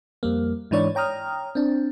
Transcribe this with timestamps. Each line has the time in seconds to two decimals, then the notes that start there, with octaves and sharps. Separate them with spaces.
0.23 F2 G3 A#3
0.71 G#2 E3 D4 C#5 D5
0.95 C#5 G5 A#5 D#6 F6
1.55 C4 D4